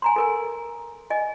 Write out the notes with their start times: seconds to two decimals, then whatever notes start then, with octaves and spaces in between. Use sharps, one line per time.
0.02 G#5 A#5 C6
0.16 A4 A#4 G#5
1.10 D#5 G#5